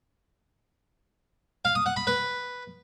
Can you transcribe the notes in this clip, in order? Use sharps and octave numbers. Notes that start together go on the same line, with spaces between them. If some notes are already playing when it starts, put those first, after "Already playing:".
F5
D#6
F#5
B5
B4